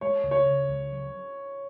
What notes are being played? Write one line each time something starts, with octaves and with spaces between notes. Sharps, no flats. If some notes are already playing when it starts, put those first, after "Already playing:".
G#3 C#5
C#2
C#5
C#3
C#2
F#3